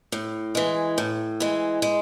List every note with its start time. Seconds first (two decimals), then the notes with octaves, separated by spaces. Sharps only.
0.12 A2
0.55 E3 G#3
0.98 A2
1.40 E3 G#3
1.82 G#3